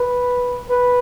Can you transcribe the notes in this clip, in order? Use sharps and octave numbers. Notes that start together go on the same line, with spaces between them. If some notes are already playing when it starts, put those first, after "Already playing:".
Already playing: B4
B4